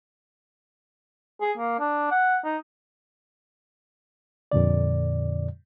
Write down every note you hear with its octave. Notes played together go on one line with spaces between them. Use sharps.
G#4
A#3
D4
F#5
D#4
F2 A#2 D3 D5